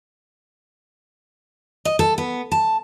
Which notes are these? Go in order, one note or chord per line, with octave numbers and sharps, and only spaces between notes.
D#5
A4
B3
A5